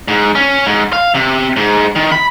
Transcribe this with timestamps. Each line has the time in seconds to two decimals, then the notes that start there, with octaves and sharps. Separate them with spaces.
0.08 G#2
0.35 C#4
0.66 G#2
0.93 F5
1.15 C3
1.57 G#2
1.96 D#3
2.12 B5